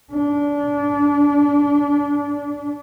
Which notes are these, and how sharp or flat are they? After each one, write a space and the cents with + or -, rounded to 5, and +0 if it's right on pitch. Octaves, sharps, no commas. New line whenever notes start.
D4 -25